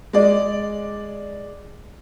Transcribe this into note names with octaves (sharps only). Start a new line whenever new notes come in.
G#3 D5